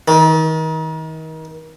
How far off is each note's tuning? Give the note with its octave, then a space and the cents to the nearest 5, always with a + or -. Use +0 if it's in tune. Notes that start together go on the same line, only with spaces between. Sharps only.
D#3 +35